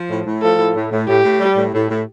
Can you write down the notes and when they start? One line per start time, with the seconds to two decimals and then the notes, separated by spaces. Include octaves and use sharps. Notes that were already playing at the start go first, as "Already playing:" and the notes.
Already playing: F3
0.10 A2
0.26 A2
0.42 F3 A4
0.59 A2
0.75 A2
0.91 A2
1.08 A2 G4
1.24 A2
1.40 G3
1.57 A2
1.74 A2
1.90 A2